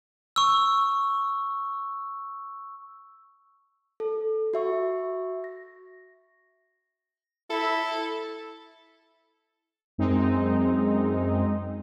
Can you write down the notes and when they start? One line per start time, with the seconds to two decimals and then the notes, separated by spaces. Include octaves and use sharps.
0.36 C#6 E6
4.00 A4
4.54 F#4 E5 C#6
5.44 A#6
7.50 E4 A4
9.98 F#2 G#3 C4 D#4